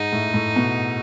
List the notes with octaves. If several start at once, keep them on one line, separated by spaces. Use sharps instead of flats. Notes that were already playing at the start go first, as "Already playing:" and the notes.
Already playing: G#2 D#4
A2
A2
B2